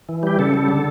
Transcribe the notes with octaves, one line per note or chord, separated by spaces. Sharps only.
E3
G3 G4
C#3 A4
G3
D3